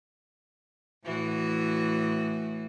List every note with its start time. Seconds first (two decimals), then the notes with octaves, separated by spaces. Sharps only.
1.05 A2 E3 F#4